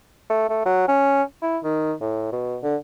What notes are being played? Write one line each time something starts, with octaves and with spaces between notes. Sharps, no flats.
A3
A3
F#3
C#4
E4
D#3
A2
B2
D3